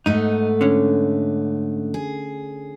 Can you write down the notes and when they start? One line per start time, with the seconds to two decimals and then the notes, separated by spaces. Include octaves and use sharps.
0.06 G#2 A3 B3 D#4
0.61 D3 C#4
1.94 G#4